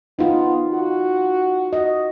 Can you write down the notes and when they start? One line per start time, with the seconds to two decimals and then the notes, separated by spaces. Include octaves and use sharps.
0.19 B3 D#4 F4
0.73 F#4
1.73 F#4 D#5